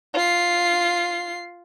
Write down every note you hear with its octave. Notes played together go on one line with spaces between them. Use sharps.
F4 C7